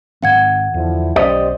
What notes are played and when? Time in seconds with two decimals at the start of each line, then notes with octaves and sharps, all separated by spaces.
0.23 G#2 D#3 C4 F5 F#5 G#6
0.74 E2 D3 F3 E4
1.16 B1 C#4 G4 C5 D5 D#5